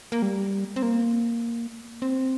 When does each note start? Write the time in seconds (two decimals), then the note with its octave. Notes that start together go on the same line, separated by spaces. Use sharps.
0.12 A#3
0.22 G3
0.76 C4
0.82 A#3
2.02 C4